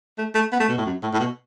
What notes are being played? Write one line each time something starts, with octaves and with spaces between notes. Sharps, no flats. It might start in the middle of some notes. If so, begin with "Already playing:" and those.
A3
A3
B3
A3
B2
A2
F#2
A2
A2
B2